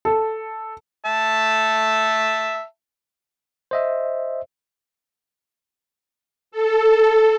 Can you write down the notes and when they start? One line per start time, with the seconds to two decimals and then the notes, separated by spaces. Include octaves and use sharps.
0.05 A4
1.05 E5 A5
3.71 C5 D#5 E5
6.52 A4